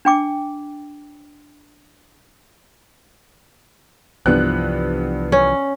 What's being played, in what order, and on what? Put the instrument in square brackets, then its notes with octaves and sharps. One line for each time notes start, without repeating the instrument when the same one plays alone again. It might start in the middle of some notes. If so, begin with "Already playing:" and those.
[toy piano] D4 G5 D6
[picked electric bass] C2 E3 F3 [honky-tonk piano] G2 B3 F#6
[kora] C#4